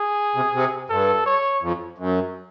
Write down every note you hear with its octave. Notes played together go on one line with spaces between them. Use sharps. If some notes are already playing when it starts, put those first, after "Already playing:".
Already playing: G#4
C3
C3
G2 A4
C#5
F2
F#2